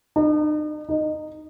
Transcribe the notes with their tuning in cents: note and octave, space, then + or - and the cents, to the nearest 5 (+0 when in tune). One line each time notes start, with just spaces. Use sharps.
D#4 -45
D#4 -15